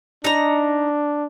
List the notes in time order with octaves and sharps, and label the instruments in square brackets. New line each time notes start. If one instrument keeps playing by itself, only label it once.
[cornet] D4 [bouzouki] D#4 A#5